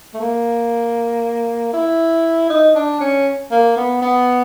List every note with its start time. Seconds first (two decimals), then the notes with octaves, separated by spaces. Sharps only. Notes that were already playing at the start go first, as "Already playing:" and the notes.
0.14 A3
0.20 A#3
1.73 E4
2.50 D#4
2.75 D4
3.00 C#4
3.51 A#3
3.77 B3
4.02 B3